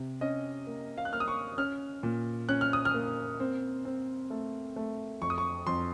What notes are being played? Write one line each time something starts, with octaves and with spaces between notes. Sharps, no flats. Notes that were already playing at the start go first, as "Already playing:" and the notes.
Already playing: C3
C#4 D#5
A#3
F5
F#6
A#3 F6
D#6
C#6
C#4 F6
A#2
C#4 F#6
F6
D#6
F6
A#3
C4
C4
A3
A3
F2 C#6
D#6
C#6
F2 C6